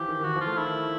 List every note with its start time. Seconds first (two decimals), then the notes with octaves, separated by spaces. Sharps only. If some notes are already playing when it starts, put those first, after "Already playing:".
Already playing: E3 F3 G4
0.08 D#3
0.20 D#3
0.24 E3 F#4
0.36 F3
0.41 F4
0.47 A3
0.58 D#3 E4